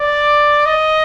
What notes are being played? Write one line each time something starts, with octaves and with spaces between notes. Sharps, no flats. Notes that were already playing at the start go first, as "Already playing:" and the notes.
Already playing: D5
D#5